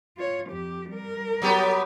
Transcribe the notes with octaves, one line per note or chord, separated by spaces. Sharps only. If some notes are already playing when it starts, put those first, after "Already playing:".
F4 C#5
F2 G4
G3 A#4
F#3 B3 G4